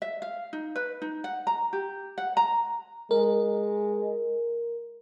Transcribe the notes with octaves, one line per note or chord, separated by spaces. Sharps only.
E5
F5
D#4
B4
D#4
F#5
A#5
G4
F#5
A#5
G#3 A#4